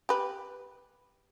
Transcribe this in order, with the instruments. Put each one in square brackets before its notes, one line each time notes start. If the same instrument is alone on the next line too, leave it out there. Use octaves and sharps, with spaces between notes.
[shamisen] G4 B4